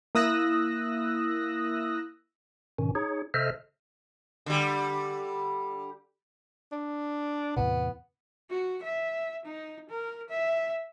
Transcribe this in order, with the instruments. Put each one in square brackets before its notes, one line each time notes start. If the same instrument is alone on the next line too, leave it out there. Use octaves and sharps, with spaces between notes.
[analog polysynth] A#3 E4 D#6 E6 F#6 A#6
[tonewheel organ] G#2 B2 D#3 C#4
D#4 G#4 C#5
C3 A4 C5 D#5 E5 F6
[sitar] D3 G3
[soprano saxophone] D4
[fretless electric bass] E2 A2 C3 [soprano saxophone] B3
[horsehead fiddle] F#4
E5
D#4
A#4
E5